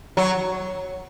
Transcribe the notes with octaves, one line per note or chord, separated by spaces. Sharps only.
F#3